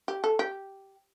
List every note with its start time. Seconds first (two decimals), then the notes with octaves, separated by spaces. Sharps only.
0.08 G4
0.24 A4
0.39 G4